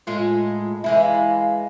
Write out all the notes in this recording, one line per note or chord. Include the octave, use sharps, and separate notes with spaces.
A2 G#3 F4
E3 G#3 E4 E5
F5